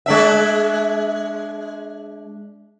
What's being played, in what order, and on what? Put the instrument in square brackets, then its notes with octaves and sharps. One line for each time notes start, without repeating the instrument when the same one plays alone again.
[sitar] G#3 D4 E5